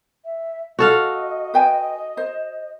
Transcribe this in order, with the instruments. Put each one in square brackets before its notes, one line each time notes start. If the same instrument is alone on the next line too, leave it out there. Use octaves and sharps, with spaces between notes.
[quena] E5
[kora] F#4 A4 F5 [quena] D#5
[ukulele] B4 G5 G#5
C5